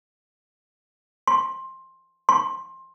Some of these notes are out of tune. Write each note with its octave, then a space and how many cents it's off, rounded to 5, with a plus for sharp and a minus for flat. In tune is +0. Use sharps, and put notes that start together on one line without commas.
C6 +15
C6 +20